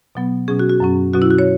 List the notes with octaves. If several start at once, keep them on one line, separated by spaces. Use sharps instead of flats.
B2 F#3 B3
B2 F#3 C#4 G#4
F#4
F#4
F#2 F#3 C#4
B2 F#3 C#4 F#4
E4
F#4
C#5